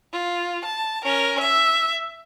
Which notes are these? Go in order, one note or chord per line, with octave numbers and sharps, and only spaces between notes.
F4
A5
C#4 A#4
E5